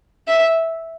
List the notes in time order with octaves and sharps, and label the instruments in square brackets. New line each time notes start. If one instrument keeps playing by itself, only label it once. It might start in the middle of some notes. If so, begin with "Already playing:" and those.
[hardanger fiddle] E5